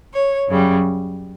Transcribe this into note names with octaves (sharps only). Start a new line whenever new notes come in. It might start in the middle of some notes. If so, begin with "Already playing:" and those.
C#5
F#2 C#3 G3